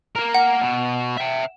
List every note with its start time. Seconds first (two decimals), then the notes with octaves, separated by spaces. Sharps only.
0.15 A#3 A#4
0.34 F#5
0.61 B2
1.17 E5 G5